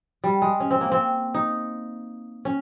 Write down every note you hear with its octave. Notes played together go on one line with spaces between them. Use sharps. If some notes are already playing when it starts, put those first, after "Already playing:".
G3
G#3
C#4
C4
A#3
C4
D#4
C#4